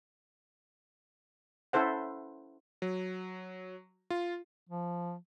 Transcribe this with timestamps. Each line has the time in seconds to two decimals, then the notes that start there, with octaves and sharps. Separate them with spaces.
1.73 C#4 E4 A4 C5 F#5
2.82 F#3
4.10 F4
4.69 F3